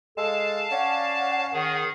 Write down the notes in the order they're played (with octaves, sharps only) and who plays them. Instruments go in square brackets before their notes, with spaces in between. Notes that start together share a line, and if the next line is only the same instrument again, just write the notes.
[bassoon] G#3 [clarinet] A4 [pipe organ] F5 A5
[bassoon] C#4 [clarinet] D5 [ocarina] F#5
[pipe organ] D#3 G#4